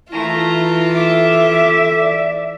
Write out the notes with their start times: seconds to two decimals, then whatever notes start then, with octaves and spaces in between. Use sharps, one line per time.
0.12 E3 A3 E4 F4 A#5
0.95 A4 E5 D6
2.00 D5